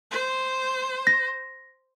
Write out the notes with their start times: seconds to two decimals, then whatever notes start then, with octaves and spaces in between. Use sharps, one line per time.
0.11 C5
1.07 A#6